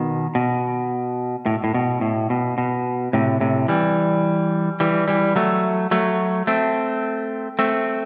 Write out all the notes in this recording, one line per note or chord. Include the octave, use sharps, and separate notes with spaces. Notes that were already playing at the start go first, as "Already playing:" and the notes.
Already playing: B2 D#3
B2
A2
A2
B2
A2
B2
B2
A2 C3
A2 C3
E3 G3
E3 G3
E3 G3
F#3 A3
F#3 A3
A3 C4
A3 C4